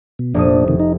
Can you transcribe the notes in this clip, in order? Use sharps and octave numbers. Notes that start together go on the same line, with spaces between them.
B2
F1 A#2 D4 D#6
C3 D#3
D#4